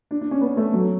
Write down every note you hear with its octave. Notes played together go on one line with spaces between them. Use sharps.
D4
D4
C#4
B3
A3
F#3